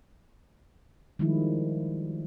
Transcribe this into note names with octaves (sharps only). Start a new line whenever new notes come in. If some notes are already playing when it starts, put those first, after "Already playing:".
D#3 F3 G3 G#3 E4